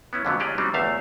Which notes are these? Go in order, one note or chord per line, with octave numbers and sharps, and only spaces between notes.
B3 C#4 E4
F2 G#2 D3 F3 F#3 B3
C#4 E4 G4 G#4 D5 D#5
F#3 G3 C4 D4 D#4
G1 E2 A3 E5 F5